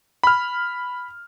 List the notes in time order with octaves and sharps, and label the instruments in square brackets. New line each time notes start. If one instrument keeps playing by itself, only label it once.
[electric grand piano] B5 F6